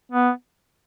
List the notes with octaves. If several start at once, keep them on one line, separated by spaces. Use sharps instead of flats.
B3